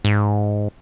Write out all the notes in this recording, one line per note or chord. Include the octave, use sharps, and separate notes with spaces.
G#2